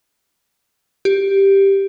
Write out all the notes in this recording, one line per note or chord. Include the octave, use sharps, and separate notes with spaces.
G4